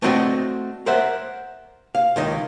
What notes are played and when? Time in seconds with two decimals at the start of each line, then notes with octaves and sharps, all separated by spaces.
0.02 A3 C4 D4 E4 F#4 D#5
0.86 A#4 C5 E5 F#5
1.95 F5
2.16 C#2 D#3 D#5